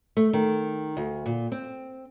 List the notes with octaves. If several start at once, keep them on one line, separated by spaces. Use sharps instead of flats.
A3
D#3
D2
A#2
C4